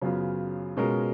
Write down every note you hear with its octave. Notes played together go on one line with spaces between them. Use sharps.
F#2 C#3 F#3 B3 F4
B2 G#3 C#4 F4 A#4